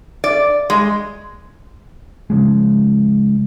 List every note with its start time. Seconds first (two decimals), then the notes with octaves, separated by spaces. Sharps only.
0.24 D5
0.70 G#3
2.30 C#3 F3 G#3